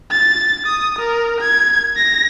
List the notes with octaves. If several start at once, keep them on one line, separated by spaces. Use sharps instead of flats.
A6
D#6
A#4
G#6
A#6